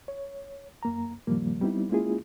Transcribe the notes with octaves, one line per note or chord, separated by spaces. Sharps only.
C#5
F#2 A#3 A#5
F#2 A#2 D#3 F3 G3 A#3
G3 B3 C4 D#4 E4
G#3 A#3 C#4 E4 F4 G#4